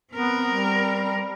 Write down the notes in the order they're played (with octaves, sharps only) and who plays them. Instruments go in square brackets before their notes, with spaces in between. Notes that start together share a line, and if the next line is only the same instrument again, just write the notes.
[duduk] B3 [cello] C4 A#4
[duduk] G3